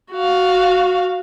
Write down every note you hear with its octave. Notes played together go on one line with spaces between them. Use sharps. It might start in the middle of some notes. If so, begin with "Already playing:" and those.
F#4 F5